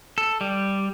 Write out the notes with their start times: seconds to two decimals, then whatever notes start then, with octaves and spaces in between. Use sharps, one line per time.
0.18 A4
0.41 G3